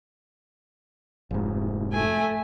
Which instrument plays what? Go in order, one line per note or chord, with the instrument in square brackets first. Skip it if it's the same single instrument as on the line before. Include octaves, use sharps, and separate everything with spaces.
[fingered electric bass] F1 G#2
[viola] A3 G#5